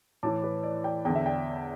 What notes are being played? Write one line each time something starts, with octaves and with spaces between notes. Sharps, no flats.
A2 E3 A5 D6
B4
D5
D5 G5
E2 D3 G5
E5
D5 G5